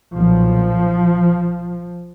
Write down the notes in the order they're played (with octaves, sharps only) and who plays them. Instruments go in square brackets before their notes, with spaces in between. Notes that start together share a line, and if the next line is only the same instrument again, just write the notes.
[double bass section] B1 A#2 F3